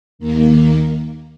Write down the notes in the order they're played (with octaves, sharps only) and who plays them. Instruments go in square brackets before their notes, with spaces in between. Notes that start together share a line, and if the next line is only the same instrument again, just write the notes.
[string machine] D#2 D#3 A#3